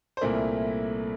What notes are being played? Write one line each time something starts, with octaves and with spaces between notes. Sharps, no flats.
C5
C2 A#2 A3 C4 E4 A#4